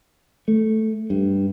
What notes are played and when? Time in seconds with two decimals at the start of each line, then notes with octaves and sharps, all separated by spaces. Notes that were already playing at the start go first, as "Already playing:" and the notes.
0.48 A3
1.10 G2